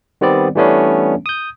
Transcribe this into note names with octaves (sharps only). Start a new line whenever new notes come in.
D#3 G3 B3 C4 D5
E3 G3 A3 B3 C#4 D4
D#6 G6